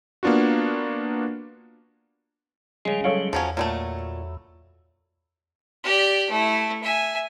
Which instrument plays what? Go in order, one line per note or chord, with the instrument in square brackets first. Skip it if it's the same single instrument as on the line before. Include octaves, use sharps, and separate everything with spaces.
[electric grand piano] A#3 B3 D4 F4 F#4
[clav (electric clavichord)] C#3 G#3 [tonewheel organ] F3 G3 C#4
[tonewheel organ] F#3 G3 [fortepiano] A4 C#5 F5
[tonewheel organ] E2 [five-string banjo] F3 F#3 C#4
[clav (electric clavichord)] A#2 [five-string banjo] F#3 G#3 A3
[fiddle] G4 D5
A3 E4
E5 G#5